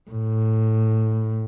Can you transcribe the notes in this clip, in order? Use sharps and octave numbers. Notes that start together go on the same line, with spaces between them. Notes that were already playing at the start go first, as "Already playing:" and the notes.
A2